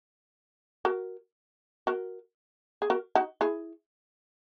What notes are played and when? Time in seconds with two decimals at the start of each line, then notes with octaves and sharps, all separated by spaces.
0.85 F#4 A#4
1.87 F#4 A#4
2.82 G#4
2.90 F#4 A#4
3.15 D#4 F#4
3.41 E4 G#4